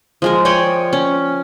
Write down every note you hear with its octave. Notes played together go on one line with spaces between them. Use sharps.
F3 G#3 A#4
C#5 D5 G5 G#5
C#4